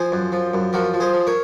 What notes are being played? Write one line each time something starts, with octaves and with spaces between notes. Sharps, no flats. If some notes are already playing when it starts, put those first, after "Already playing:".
Already playing: F3 G#4 C5
F#2
F3
F#2
F3 F#4 A#4
F3
G#4 C5
F3
A#4 C#5